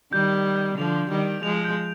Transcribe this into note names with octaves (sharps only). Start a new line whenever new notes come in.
D#3 G3 G6
G6
G6
D3 F3 F7
G6
D#3 G3
D7
F3 G#3 F7
G6